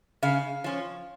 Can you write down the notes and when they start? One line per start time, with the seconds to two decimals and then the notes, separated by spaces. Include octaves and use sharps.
0.23 C#3 F5
0.64 F3 C#4